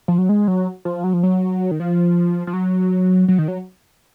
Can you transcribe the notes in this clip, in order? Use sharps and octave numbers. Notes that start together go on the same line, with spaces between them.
F3
F#3
G#3
F#3
F3
F#3
F3
F#3
D#3
F3
F3
F#3
F#3
D#3
F#3